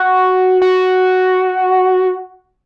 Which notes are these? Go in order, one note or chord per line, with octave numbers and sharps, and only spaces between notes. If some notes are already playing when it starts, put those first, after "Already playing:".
Already playing: F#4
F#4